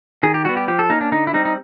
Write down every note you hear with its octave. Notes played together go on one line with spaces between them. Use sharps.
D#3 G#4
G4
G3 B3 F#4
G4
F3 G4
A4
A#3 C#4 D#4
D4
D3 D#4
E4
G3 C4 D#4
D#4